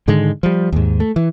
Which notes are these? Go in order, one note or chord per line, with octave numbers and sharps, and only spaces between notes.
G#2 D3 D#3 G#3
F3 G3
D#2 G#2
A3
E3